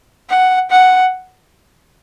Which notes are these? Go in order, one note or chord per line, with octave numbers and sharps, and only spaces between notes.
F#5
F#5